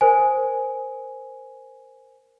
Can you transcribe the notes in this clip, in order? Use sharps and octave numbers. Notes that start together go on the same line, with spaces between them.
A#4 C5 G#5